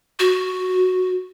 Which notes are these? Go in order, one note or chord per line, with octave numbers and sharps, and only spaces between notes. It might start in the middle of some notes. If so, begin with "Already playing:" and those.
F#4